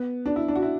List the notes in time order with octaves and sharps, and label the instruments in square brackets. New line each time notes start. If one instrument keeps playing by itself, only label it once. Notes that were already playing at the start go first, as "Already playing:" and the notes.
Already playing: [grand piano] B3
D4
E4
D4
F#4
E4